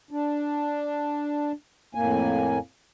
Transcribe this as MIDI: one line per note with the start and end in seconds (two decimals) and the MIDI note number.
0.11 1.52 62
1.95 2.59 41
1.95 2.59 45
1.95 2.59 58
1.95 2.59 80